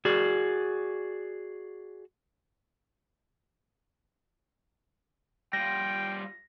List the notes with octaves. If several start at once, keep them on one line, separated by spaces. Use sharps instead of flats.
F#4 G#4 D5
G3 F4 G5 A#6